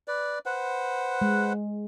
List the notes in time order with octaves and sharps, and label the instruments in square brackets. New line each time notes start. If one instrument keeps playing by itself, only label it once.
[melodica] B4 D5
B4 C5 F#5
[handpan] G#3